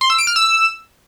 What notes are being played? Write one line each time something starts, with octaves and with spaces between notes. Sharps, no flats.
C6
E6
D7
F6
E6